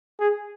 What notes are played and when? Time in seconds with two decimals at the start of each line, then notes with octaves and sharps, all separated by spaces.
0.20 G#4